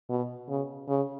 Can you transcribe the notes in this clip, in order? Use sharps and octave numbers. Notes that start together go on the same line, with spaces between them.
B2
C#3
C#3